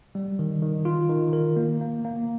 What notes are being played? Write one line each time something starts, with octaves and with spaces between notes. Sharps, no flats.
G3
D#3
D#3
F4
D#3
A#4
A#3
A#3
A#3